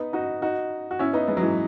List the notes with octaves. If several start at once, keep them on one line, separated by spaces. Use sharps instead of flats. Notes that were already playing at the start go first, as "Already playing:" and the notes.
Already playing: B3 D#4
D#4 F#4
D#4 F#4
F#4
C#4 E4
B3 D#4
G#3 B3
F#3
E3 G#3